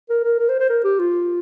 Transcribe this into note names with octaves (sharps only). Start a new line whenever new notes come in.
A#4
A#4
A#4
C5
C5
A#4
G4
F4